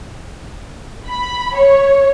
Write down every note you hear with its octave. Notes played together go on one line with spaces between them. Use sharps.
B5
C#5